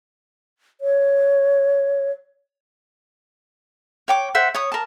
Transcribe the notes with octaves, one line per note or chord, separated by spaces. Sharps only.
C#5
C#5 G5 D6
C5 E5 F#5
C#5 D#6
A#4 A5